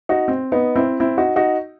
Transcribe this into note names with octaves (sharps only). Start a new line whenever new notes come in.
D#4 F#4
C4
B3 D#4
C4 E4
C4 E4
D#4 F#4
D#4 F#4